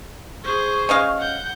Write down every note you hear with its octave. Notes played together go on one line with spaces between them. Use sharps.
G#4 C5 C#6
C#4 D#5 F5
F#5 G6